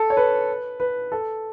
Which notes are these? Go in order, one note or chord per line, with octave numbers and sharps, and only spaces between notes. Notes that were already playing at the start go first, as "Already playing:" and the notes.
Already playing: A4
C#5
B4
B4
A4